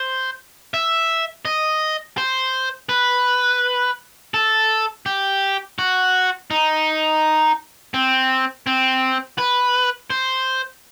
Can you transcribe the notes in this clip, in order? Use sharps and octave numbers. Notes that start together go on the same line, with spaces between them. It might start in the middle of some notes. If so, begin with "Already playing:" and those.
Already playing: C5
E5
D#5
C5
B4
A4
G4
F#4
D#4
C4
C4
B4
C5